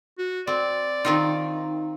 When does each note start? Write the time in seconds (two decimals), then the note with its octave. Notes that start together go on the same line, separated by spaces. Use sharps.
0.18 F#4
0.47 C4 D5
1.05 D#3 C4 D#4 F4